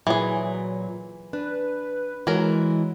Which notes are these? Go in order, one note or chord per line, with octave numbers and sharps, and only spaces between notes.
A#2 E3 F#3 G#4
D4 B4
E3 F#3 G#3 A#4